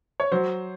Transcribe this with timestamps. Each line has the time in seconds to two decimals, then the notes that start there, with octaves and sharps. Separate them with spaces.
0.20 C#5
0.32 F#3 C5